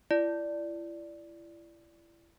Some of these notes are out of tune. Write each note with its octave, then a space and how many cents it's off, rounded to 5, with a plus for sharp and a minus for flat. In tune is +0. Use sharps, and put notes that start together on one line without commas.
E4 +35 D5 +0